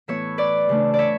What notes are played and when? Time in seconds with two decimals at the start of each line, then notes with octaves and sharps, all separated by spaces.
0.08 A2 E3 B3 E4 C#5 E5
0.38 B4 D5
0.69 C#3 E3 A3 D4
0.94 D5
0.99 C#5 E5